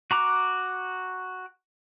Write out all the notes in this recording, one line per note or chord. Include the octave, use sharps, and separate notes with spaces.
F#4 A#5 D6 F#6